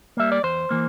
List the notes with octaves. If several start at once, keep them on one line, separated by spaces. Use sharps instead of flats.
G3 A#3 E5
D5
E2 C5
E3 A#3